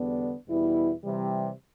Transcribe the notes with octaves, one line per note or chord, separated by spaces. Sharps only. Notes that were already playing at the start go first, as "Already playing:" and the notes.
Already playing: E2 D3 G3 B3 D4
E2 B2 G3 B3 E4
C3 E3 G3